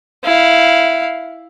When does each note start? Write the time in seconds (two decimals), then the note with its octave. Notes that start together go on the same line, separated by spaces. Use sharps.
0.24 E4 F5